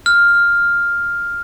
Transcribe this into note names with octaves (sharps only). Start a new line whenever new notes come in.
F6